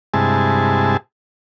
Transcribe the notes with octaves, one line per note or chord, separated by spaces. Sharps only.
G2 C3 G#3 E4 G#4 A5